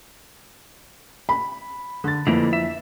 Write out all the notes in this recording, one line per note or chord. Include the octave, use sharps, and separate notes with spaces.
B5
D3 A6
F2 D3 E3 A3 A#3
E5